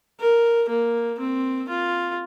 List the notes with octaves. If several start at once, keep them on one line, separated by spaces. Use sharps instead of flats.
A#4
A#3
C4
F4